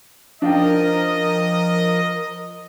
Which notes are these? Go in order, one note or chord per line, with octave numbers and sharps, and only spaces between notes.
F3 D4 F4 A#4 D#5 G5